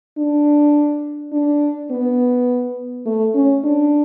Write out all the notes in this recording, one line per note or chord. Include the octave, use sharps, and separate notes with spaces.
D4
D4
B3
A3
C#4
D4